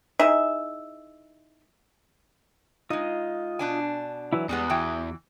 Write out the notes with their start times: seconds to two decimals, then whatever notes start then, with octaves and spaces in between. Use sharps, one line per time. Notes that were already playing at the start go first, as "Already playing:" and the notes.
0.19 D#4 E4 G#4 E5
2.90 G#3 D#4 F4 D#5
3.59 B2 D4 G#5
4.33 E3 F#3 E4
4.49 E2 G3 G#3 B3 D#6
4.70 E3 F#4 G5